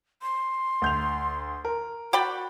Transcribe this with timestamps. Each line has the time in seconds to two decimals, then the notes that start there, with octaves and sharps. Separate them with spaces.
0.22 C6
0.82 D2 G6 F7
1.65 A#4
2.13 F#4 D5 G5 B5